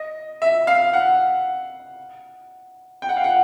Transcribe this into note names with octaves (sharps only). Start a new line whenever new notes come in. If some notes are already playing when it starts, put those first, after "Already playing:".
Already playing: D#5
E5
F5
F#5
G5
F#5
F5
F#5